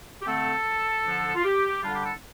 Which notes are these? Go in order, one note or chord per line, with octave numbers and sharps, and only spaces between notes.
G4
D3 A3 C4 A4
D3 F3 D4
F4
G4
D3 G3 D4 F4
G4
A4